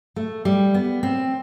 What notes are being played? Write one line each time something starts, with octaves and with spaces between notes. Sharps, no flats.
A3
G3
B3
C4